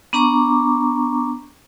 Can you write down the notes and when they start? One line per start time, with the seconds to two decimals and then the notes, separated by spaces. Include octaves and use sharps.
0.13 B3 D4 A#5 C#6 D6